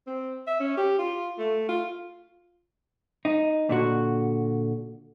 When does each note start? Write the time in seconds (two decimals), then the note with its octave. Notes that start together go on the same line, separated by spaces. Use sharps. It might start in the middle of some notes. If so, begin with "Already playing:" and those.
0.07 C4
0.47 E5
0.60 C#4
0.77 G4
0.99 F4
1.38 A3
1.69 F4
3.25 D#4
3.69 A#2 D3 F#4